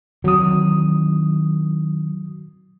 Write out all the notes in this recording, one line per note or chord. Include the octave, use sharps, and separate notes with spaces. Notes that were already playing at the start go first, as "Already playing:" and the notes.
D#3 E3 F#3 C4 D#6